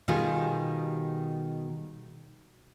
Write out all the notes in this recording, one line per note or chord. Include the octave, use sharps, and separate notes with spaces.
B2 D#3 G3 F4 G4 G#4